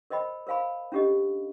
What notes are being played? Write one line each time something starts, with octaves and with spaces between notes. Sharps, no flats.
A#4 C5 D#5 G5 B5
A#4 C5 F5 G#5 B5
C#4 D4 G4 A4 D#5